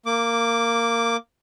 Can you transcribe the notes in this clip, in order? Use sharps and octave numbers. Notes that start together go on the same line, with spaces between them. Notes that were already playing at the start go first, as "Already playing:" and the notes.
A#3 D6